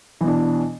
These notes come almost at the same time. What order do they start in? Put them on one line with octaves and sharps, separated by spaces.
E3 B2 D4